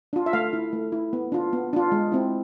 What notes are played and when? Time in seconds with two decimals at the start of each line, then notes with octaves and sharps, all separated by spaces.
0.13 D4 F4
0.26 E5
0.33 A3 F5
0.53 E4
0.73 A3
0.92 E4
1.13 B3
1.32 D4 F4
1.53 B3
1.73 D4 F4
1.92 G#3
2.12 C4 E4